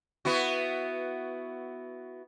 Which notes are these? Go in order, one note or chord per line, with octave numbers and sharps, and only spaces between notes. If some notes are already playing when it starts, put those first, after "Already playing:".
B3 E4 F#4